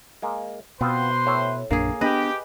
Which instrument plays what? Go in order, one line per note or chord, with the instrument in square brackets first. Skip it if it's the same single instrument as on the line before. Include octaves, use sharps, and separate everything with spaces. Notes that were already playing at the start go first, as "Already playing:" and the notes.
[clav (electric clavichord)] G#3 A#3
[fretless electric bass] B2 [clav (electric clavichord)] B3 C4 F4 [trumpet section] B4 C5 C6
[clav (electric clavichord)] A2 C#5 E5
[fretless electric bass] A#1 F#2 D4 [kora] A#3 G#4
[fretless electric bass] B3 D4 [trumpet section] G4 [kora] B4 D#5